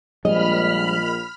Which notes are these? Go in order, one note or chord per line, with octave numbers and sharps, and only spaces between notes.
A#1 F3 G3 G#3 D#5 B5 F6